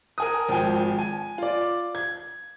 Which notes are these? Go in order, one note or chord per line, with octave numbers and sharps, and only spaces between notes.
A#4 G#5 D#6
G#1 F3 G5 G#5
G#5
F4 D5
G#6